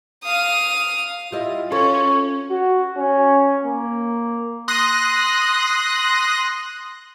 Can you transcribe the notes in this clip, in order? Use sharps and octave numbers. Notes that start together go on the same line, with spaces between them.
F5 D#6
G3 E4 F4 D#5
C#4 A4 C#5
F#4
C#4
A#3
C6 D#6 F#6 A#6